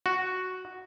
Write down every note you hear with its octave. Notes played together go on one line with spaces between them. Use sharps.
F#4